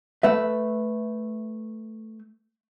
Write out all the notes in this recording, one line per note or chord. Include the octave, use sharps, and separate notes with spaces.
A3 B4 E5